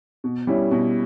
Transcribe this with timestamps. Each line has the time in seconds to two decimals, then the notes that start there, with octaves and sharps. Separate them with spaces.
0.24 B2
0.47 G3 C#4 E4
0.71 B2